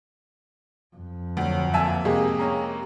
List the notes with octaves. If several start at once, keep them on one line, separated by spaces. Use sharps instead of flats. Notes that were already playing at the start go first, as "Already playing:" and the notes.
F2
D2 F#3
A#3 E5 G#5 A5
C3 G#3 A#3 G#4
C#4 A#5